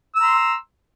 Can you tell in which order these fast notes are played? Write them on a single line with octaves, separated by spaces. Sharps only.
E6 A#5 C6